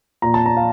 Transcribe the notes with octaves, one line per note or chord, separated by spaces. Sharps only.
A#2 A#5
A5
A#5
F5